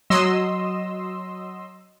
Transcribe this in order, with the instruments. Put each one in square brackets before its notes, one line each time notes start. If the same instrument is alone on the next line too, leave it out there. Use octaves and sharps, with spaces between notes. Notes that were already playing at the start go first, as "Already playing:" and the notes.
[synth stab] F#3 D#5 C6 E6